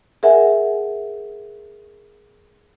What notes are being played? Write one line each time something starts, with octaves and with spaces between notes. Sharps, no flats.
G#4 A#4 E5 F#5 G#5